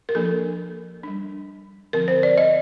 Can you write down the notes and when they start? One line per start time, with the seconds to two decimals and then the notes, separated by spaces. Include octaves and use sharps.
0.09 A#4
0.15 F3 A#3 D4 A4
1.03 G3 D4
1.93 D3 F3 C4 A#4
2.08 C5
2.23 D5
2.38 D#5